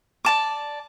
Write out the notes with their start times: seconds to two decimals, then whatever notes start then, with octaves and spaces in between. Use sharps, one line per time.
0.25 D5 A5 D6